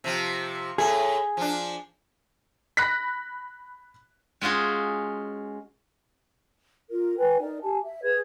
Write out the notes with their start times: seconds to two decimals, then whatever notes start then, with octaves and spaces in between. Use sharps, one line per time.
0.04 C3 F3
0.78 A2 A3 G#4
1.37 F3 D4
2.77 B5 F#6 A#6 B6
4.41 G#3 C#4 F4 F#4 G#4
6.91 F4 A#4
7.18 B4 G5 G#5
7.41 D#4 A#4 D5
7.63 G4 G#5 A5
7.83 E5
8.03 G#4 B4 G#6